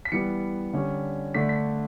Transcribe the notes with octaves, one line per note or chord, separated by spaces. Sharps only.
B6
E3 G3 B3 C#7
D3 G3 C#4
D3 A3 D4 B6
B6